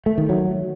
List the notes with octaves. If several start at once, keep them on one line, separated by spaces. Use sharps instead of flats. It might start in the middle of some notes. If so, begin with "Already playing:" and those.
A3
D#3
F#3